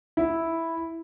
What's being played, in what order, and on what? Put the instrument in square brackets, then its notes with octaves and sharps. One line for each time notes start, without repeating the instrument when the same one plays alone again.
[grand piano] E4